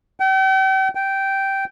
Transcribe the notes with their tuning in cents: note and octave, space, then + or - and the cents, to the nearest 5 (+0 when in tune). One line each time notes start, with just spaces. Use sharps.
G5 -40
G5 -10